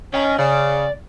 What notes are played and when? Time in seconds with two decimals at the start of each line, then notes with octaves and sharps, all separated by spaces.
0.14 C#4 D#5 G5
0.39 C#3 D5